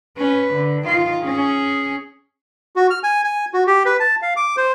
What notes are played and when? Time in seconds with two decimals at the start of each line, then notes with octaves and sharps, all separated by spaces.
0.17 C#4 B4
0.53 D3
0.85 D#3 F4
1.23 C#4 G#4
2.76 F#4
2.90 F6
3.03 G#5
3.24 G#5
3.54 F#4
3.67 G4
3.85 B4
4.00 A5
4.22 F5
4.36 D6
4.57 C5